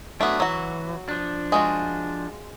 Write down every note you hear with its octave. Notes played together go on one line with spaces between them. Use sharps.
F#3 A3 B3 D4
E3 F#3 F#4
F3 D4
G#3 F4 F#4